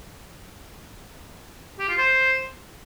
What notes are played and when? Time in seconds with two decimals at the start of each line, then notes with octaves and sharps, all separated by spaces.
1.79 G4
1.89 F4
1.98 C5